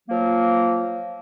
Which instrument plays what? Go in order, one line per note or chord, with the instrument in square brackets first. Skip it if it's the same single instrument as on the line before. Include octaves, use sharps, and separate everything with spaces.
[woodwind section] F3 F#3 A#3